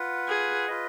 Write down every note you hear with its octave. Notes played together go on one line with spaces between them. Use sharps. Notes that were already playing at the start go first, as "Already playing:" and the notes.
Already playing: F4 B4 F#5
G#4
F4 B4 D#5